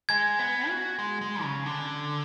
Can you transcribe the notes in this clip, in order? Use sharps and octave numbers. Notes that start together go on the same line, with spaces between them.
G#3 G#6
B3
F#4
G#3
G#3
C#3
D3